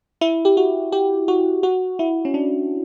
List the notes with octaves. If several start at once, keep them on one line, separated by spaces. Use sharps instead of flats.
E4
G4
F#4
G4
F#4
F#4
E4
C#4
D4